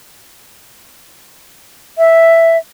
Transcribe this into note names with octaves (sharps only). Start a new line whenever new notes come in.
E5